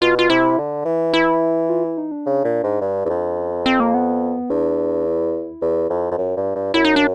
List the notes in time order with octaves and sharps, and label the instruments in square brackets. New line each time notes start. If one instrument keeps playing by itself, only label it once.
[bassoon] B2 [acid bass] F4
[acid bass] F4
[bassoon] C3 [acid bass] E4
[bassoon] D3
E3
[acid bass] E4
F4
E4
D#4
D4
[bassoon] C#3
A#2
G#2
G2
E2
F2
[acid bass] C#4
C4
C4
A#3
B3
[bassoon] E2 [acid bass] D4
[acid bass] E4
[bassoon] E2
F2
F2
[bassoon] F#2 [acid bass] F4
[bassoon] G2
G2
[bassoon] F#2 [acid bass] E4
[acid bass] D#4
D4